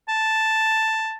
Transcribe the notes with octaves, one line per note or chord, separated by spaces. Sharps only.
A5